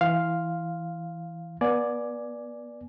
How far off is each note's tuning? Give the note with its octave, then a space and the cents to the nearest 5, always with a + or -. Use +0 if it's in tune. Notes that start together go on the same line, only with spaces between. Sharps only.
E3 +0 F5 +0 C6 +0
B3 -35 D5 +0 G#5 +15